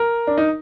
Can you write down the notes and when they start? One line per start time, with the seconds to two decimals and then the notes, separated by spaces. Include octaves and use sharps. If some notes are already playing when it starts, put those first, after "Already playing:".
Already playing: A#4
0.27 D4
0.37 D#4